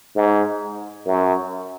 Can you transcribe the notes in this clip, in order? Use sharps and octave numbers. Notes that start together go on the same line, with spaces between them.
G#2
F#2